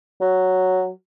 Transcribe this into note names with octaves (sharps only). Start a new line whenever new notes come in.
F#3